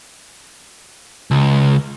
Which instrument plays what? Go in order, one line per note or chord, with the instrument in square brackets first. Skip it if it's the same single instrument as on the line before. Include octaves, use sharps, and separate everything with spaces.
[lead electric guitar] C#2